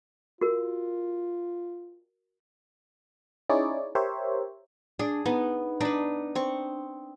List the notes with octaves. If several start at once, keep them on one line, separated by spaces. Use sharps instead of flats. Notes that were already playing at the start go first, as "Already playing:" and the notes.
F4 F#4 A#4
C#4 D#4 E4 G#4 C#5 D5
G4 A#4 C5 C#5 E5
D4 G#4
B3 D#4
D4 D#4 B4
C4 C#6